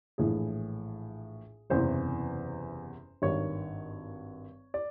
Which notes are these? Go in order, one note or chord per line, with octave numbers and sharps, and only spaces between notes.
A#1 A2 E3 G#4
F#1 E2 C3 E3 C5
G#1 G2 D#3 C#5
D5